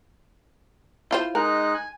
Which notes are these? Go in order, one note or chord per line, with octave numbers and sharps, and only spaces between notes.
E4 F4 C5
G#3 D#4 A#4 F#6
G#5